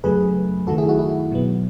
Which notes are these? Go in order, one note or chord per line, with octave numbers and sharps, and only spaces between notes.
F#2 C#3 F#3 A3 G#4 B4
F#2 D#3 A3 F#4 A4
E4 G#4
F#4
E4
B2 F#3 B3